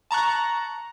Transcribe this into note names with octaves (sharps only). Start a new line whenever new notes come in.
A5 A#5 C#6 F#6